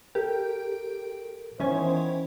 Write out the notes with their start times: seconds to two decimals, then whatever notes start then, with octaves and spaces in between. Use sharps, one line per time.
0.15 G4 A4 A#4
1.60 D#3 E3 B3 C#4 C5 G#5